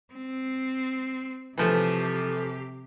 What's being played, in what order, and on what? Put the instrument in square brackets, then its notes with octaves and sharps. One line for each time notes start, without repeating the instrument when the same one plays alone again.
[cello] C4
[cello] C3 G4 [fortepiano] E3 F3 A3